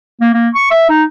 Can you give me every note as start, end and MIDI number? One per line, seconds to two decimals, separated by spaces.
0.21 0.30 58
0.34 0.49 58
0.55 0.69 85
0.71 0.88 76
0.89 1.04 63